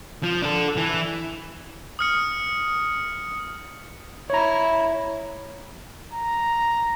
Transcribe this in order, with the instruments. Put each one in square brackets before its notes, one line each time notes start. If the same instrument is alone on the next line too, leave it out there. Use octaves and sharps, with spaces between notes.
[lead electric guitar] F3
D4 A4
E3
[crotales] D#6 F6 C#7
[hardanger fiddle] E4 [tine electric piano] C#5 A#5
[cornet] A#5